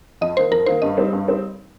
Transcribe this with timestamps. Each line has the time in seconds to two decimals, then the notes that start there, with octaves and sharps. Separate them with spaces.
0.21 F2 D#5
0.37 D#3 A#3 D#4 C5
0.51 F2 A#4
0.66 D#3 A#3 D#4 C5
0.82 G2 D#5
0.97 G3 C4 D#4
1.13 G2
1.28 G3 C4 D#4